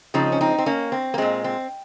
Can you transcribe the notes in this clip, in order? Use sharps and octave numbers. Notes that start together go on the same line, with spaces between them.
C#3 F3 G#3 C4 D#4
C#4
C4 D#4
C4
A#3 C#4
C4
A#3
A#2 G#3 C4
C4